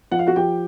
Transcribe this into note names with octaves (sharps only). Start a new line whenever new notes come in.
F3 F#5
F5
F#4 F#5
F3 G4 G5